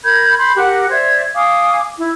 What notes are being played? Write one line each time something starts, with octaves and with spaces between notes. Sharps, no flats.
A#4 B5 G6 G#6
B5 C6 G6
G4 A#4 F#5 F#6
C5 D5 E5 G#6
F5 G#5 D6 D#6
E4